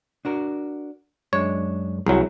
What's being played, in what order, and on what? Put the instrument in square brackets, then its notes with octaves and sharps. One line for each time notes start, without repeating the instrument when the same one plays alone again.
[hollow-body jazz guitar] D4 F#4 A#4
[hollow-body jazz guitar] F#2 G#3 D4 [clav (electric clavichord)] C#5
[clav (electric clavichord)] C2 F#3 [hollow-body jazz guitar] G#4 A#4 E5